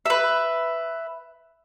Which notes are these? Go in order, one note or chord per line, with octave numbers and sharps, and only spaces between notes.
B4 E5